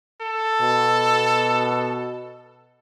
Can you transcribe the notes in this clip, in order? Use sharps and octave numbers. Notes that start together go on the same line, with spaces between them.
A4
B2